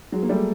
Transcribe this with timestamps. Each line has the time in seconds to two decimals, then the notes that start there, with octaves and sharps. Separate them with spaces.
0.12 F#3 G#3
0.23 A#3
0.29 G3 A3